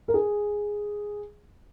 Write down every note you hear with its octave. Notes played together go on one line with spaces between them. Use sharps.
A#4
G#4